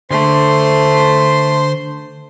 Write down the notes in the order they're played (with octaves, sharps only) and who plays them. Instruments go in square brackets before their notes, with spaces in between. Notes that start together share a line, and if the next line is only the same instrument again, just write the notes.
[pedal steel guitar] D3 [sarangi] A3 [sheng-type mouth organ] C5 C6